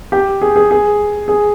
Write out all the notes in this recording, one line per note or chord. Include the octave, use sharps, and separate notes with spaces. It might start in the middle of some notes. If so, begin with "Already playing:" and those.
G4
G#4
G#4
G#4
G#4